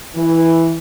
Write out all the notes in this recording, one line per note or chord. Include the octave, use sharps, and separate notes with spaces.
E3